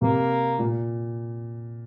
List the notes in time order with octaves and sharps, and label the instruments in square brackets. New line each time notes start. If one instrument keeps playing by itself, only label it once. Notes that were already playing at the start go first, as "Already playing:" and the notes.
[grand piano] C3 [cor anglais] A#3
[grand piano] A#2